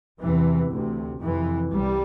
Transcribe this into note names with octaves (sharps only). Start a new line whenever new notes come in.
E2 C3 E3
D2 C3
F2 C3 E3
C2 C3 G3